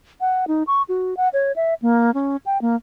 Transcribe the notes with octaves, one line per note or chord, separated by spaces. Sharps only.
F#5
D#4
C#6
F#4
F#5
C#5
E5
A#3
C#4
G5
A#3